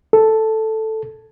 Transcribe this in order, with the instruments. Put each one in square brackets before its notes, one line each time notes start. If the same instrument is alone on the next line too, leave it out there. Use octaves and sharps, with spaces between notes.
[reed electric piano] A4